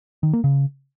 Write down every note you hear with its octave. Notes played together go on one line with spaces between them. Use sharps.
D#3
A#3
C#3